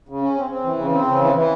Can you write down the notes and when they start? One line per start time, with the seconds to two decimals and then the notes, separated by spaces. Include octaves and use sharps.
0.09 C#3
0.22 C#4
0.37 C4
0.50 C4
0.64 E3
0.78 C#3
0.92 C4
1.07 C#3
1.20 E3
1.35 E3